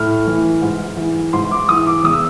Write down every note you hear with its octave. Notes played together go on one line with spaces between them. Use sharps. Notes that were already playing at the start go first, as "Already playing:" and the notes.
Already playing: A2 F6
E3
G#2
E3
G#2 C6
D6
E3 D#6
D6
E2 D#6
E6